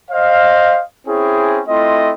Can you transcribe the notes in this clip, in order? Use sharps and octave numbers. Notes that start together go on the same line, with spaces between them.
C5 D#5 F5
C4 C#4 E4 G#4
A3 C4 E4 F4 D#5